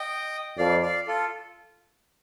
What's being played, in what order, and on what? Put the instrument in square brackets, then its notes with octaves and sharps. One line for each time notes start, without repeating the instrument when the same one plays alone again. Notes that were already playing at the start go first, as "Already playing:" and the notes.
Already playing: [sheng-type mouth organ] D#5 G5
[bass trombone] F2 [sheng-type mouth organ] D5 F5
[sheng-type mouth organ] D5 F5
F4 A4